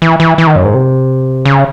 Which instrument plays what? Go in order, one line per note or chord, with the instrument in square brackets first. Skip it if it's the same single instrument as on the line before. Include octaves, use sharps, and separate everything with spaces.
[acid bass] E3
E3
E3
D#3
F#2
G#2
C3
C#3